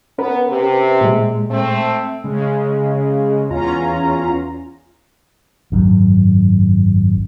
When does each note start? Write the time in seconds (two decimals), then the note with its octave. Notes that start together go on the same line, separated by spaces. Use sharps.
0.19 B3 C#4 A#4 B4
0.48 C3
1.01 A#2 G#3
1.50 A3 C4
2.24 C#3 G#3
3.50 E2 C#4 F4 A#5
5.72 G#1 F#2